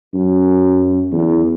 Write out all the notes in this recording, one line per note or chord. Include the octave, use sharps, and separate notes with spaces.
F#2
E2